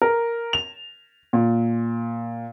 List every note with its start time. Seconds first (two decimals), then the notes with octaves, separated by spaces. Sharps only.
0.02 A#4
0.53 F7
1.33 A#2